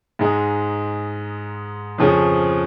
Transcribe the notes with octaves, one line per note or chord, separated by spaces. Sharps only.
G#2 G#3 D#4 G#4
F2 C#3 F3 C#4 G#4